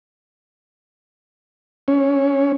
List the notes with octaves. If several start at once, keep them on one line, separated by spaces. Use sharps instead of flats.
C#4